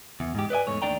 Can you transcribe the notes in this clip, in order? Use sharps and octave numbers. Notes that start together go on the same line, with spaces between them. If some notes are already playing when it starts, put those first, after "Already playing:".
E2
G#2 G4
B4 D5 D#5 G#5
E2 G#2 A3 C#5
D#2 A3 D4 D5 G5 A#5